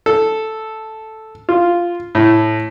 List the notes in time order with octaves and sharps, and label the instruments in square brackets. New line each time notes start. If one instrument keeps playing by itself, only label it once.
[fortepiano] A4
F4
A2